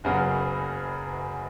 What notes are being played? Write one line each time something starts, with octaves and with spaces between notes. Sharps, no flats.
F#1 F#2 C#3 F#3 B3